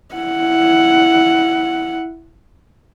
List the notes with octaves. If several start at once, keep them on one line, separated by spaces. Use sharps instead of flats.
E4 F#5